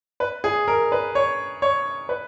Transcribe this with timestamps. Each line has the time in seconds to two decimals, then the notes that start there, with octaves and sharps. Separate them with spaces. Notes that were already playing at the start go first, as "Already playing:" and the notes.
0.20 B4
0.44 G#4
0.68 A#4
0.92 B4
1.15 C#5
1.62 C#5
2.09 B4